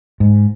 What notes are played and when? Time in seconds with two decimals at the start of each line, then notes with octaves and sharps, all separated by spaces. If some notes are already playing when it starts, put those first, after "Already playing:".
0.20 G#2